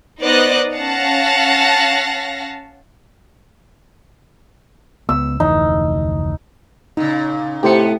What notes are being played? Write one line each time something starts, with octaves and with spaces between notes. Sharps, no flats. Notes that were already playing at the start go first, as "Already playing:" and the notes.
B3 D#4 C5 D5 D#5 F#6
C#4 F5 F#5 A5 A#6
C#2 B3 E6
F1 D2 E3 D#4
A#2 C#3 D#4
A2 C3 B3 G4 C5 C#7